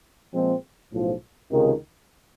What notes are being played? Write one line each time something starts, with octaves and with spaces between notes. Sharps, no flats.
A#2 F3 G#3 C4
B1 A2 F3
C#2 C3 D#3